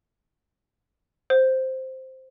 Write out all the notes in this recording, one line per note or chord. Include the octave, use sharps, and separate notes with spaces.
C5